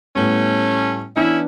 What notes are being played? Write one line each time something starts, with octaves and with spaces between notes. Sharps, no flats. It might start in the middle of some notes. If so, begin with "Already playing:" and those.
A2 G3 A3 B3 C#4
E3 B3 C#4 D4 E4